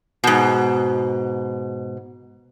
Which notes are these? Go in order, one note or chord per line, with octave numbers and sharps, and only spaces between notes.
G#2 B2